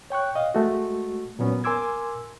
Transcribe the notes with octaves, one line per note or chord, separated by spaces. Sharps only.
C#5 G5 C#6 F#6
D#5 F5
G#3 A3 F#4
A#2 F#3 B3 C#4
A#4 G#5 C6 D6 E6 G#6